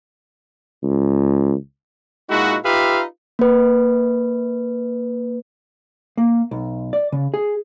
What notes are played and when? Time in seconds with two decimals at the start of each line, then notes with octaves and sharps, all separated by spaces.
0.83 C#2
2.30 A#2 G#3 D#4 E4 F#4
2.65 D#4 F4 G4 B4 E5 F5
3.39 A#3 B4
6.17 A#3
6.51 B1
6.93 D5
7.12 C#3
7.34 G#4